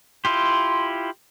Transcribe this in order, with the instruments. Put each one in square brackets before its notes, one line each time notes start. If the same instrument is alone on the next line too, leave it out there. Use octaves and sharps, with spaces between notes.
[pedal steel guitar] E4 F4 G4 [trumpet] C6